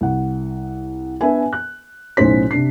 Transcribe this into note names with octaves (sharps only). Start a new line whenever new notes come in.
C2 F#5
B3 D4 B4 E5 G#5
F#6
B1 A2 C#4 D#4 C5 B6
C3 D4 C7